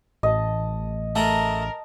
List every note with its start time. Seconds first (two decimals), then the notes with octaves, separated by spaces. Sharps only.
0.23 A1 D#5 A5
1.16 A3 G#4 A#4 A5